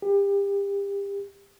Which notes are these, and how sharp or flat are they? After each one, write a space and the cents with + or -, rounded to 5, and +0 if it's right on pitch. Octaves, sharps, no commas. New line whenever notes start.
G4 +30